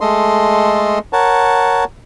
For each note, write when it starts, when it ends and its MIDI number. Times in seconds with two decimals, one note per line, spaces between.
0.01 0.99 56
0.01 0.99 57
0.01 0.99 69
0.01 0.99 75
0.01 0.99 84
1.13 1.84 70
1.13 1.84 73
1.13 1.84 78
1.13 1.84 81